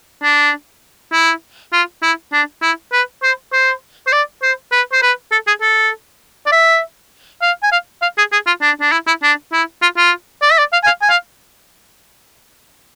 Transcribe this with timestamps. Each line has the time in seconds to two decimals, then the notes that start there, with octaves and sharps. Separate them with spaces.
0.23 D4
1.13 E4
1.73 F4
2.03 E4
2.33 D4
2.62 E4
2.92 B4
3.23 C5
3.53 C5
4.07 C5
4.13 D5
4.43 C5
4.72 B4
4.93 C5
5.03 B4
5.32 A4
5.47 G#4
5.62 A4
6.46 D5
6.52 E5
7.42 F5
7.63 G#5
7.72 F5
8.02 F5
8.18 G#4
8.32 G#4
8.47 F4
8.62 D4
8.81 D4
8.92 E4
9.07 E4
9.23 D4
9.53 E4
9.82 F4
9.97 F4
10.42 D5
10.51 E5
10.59 D5
10.73 F5
10.83 G#5
10.87 F5
11.02 G#5
11.09 F5